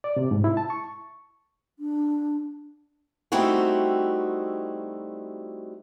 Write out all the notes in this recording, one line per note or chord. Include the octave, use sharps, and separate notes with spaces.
D5
C3
G#2
E4
A5
C#6
D4
G3 A3 C4 D#4 E4 F#4